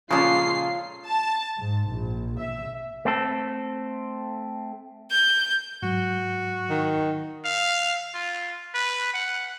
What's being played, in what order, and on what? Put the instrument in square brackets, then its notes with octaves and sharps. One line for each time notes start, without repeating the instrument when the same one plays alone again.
[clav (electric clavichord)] A#2 C#3 [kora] F3 A4 [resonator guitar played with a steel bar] G#3 C#4 [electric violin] F4 C7
[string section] A5
G#2
A#1
E5
[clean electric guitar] A3 C4 A4
[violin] G6
[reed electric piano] G#2 F#3 [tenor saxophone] F#4
[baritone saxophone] D#3
[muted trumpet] F5
F4
B4
F#5